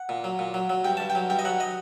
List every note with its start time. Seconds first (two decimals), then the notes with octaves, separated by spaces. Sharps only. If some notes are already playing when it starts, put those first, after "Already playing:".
Already playing: F#5
0.09 A#2
0.24 F#3
0.39 A#2
0.54 F#3
0.70 F#3
0.84 G2 G5
0.97 G2 A5
1.10 G5
1.15 F#3
1.30 G2 G5
1.39 D#5
1.45 F#3 F#5
1.60 D#5